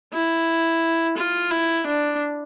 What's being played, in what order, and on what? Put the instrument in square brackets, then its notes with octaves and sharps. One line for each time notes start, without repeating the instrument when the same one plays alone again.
[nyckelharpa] E4
F4
E4
D4